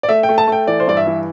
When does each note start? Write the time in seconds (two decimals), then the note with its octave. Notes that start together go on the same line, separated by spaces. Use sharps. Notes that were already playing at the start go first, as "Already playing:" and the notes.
0.03 D5
0.09 A3 E5
0.23 G5
0.29 A3
0.38 A5
0.48 A3 G5
0.67 E3 D5
0.80 C5
0.87 G2 D5
0.97 E5
1.07 E3